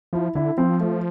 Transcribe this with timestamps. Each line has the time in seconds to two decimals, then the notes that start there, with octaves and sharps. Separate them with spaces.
0.13 F3 E4
0.35 D3 E4
0.58 F3 C4
0.80 A3